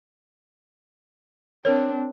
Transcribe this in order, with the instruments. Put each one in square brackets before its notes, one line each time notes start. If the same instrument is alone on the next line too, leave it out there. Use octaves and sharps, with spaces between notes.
[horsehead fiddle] C4 D4 [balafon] A#4 C#5